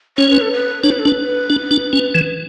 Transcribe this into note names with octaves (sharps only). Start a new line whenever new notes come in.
C#4 C#5
B4
A4
B4
D4 C#5
B4
A4
D4 B4
D4
D4
C#4
E3